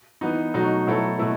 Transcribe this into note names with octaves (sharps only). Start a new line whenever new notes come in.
E3 B3 D#4
B2 F#3 A3 D#4 F#4
B2 F#3 A3 E4 A4
B2 A3 E4 A4